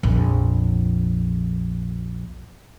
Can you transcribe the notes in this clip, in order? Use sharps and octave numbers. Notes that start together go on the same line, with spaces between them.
A#1 F2